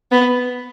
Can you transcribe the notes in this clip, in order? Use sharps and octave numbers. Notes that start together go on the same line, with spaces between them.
B3